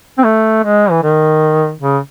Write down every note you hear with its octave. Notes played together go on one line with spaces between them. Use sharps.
C4
A3
G#3
E3
D#3
C#3